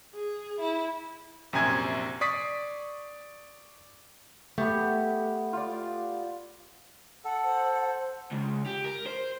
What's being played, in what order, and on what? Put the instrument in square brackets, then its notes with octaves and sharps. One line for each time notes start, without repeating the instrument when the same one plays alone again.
[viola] G#4
E4
[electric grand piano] A#1 F#2 C3 G#5 G#6
D5 C#6 D#6 B6 C7
[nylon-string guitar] A3 [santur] B3 G4
[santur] F4 D5
[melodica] A4 [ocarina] F#5
[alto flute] C5
[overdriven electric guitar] C#2
G4
A#4
C5